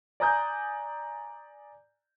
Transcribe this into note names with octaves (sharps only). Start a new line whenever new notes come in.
D5 G#5 A#5 D#6 F#6 G6